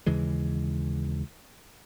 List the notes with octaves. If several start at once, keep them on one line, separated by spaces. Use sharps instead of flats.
D#2 C#3 E3 G#3